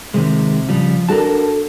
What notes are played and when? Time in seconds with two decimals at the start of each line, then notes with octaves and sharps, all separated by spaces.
0.14 C3 D#3 G#3
0.69 C#3 F3 G3
1.09 D4 F#4 A4 A#4 A5